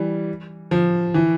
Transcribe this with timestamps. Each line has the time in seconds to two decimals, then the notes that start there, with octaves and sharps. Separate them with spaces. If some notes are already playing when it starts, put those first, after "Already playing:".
Already playing: E3 G3
0.71 F3
1.14 E3